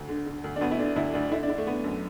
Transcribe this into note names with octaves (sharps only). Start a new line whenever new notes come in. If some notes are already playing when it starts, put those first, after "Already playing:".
Already playing: D2
D3
D3
D2
D4
D2 B3
E4
D3 D4
D2 E4
D2 D4
D3 E4
D4
D3 E4
A3
D3 B3
F#2